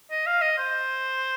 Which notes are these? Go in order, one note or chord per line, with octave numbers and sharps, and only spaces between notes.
D#5
F5
D#5
C5